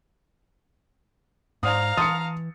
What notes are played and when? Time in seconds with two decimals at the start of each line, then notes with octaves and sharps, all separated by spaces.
1.63 G#2 C5 D5 F5 A#5 D#6
1.97 E3 A5 C6 D#6 A6 C#7